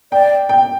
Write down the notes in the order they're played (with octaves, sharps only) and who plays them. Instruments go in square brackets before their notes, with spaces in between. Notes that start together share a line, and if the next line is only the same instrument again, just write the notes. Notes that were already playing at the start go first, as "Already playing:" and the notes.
[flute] D5 [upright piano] G5
[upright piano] G5